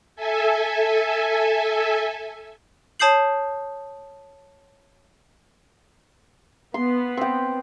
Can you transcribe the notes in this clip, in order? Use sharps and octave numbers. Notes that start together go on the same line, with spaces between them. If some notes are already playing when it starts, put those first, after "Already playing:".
A4 E5 G#5
C#5 A5 D#6 G6 C7 F#7
B3 C6
C4 G5